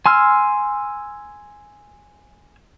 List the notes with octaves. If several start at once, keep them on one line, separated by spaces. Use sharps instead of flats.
G#5 C6 E6 F6